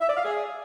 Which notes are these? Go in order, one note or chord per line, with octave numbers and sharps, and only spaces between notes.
E5
D5
F5
G#4